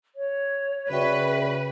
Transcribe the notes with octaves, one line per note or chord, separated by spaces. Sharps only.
C#5
C#3 F#4 B4 D5 E5 G5